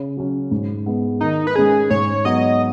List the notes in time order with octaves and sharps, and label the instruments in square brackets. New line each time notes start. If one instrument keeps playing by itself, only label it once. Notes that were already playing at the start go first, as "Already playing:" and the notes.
Already playing: [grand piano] C#3
F#3 C#4
G#2
G#3 B3
[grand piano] D#3 [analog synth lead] D#4
[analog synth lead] B4
[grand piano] G#3 C#4 [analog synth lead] G#4
[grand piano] G#2 [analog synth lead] C#5
[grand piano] F#3 B3 F#4 [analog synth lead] D#5